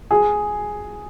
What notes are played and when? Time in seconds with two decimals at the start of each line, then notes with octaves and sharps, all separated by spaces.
0.11 G#4